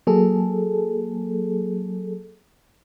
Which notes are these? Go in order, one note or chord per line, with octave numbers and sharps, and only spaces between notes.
F#3 A#3 G#4 A4